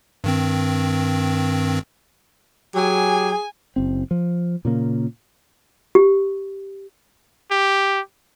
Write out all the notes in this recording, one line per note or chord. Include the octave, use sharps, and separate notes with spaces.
G2 D#3 C4
F#3 G4 G#4 G#5
F#1 C4
F3
A#2 C#3 A#3
G4
G4